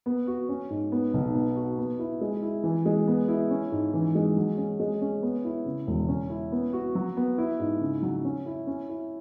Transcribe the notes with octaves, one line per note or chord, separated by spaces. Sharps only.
B3
F#4
C#4
G#2
B3
B1
B3
F#4
B3
E4
G#3
E4
E3
G#3
B3
E4
C#4
G#2
E3
G#3
F#3
C#4
G#3
C#4
B3
E4
C#3
E1
C#4
E4
B3
F#4
F#3
B3
E4
G#2
C#3
F#3
C#4
E4
C#4
E4